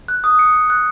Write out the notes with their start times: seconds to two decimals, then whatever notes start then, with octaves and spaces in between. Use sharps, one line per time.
0.08 F#6
0.24 D#6
0.39 C#7
0.54 D#6
0.70 F#6